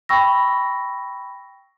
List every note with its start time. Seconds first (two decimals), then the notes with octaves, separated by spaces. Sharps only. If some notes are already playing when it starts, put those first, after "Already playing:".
0.09 G5 B5 C#6 E6 A#6